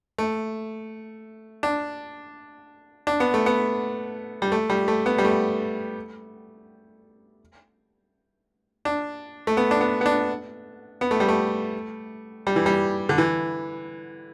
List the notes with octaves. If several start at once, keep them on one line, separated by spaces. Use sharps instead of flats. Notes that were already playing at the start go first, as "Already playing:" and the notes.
A3
D4
D4
B3
A3
B3
G3
A3
G3
A3
B3
G3
A3
D4
A3
B3
D4
B3
B3
D4
B3
A3
G3
A3
G3
E3
G3
D3
E3